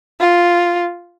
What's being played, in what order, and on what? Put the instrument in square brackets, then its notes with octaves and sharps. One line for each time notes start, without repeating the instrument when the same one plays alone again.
[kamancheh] F4